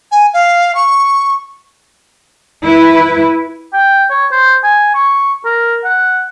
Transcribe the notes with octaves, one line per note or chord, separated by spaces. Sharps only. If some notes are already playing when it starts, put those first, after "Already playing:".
G#5
F5
C#6
E4 B4
G5
C#5
C5
G#5
C#6
A#4
F#5